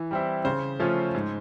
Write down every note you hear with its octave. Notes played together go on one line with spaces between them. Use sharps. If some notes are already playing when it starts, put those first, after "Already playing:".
Already playing: E3
G3 C4 E4
C#3 C5
F3 A3 C#4 F4
G#2